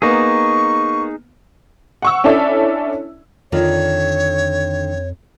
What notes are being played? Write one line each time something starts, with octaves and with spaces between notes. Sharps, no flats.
A#3 B3 D#4 G#4 C#6
F#5 C#6 E6
C#4 D4 E4 A4 D5 E5
F2 D3 D#3 F4 C#5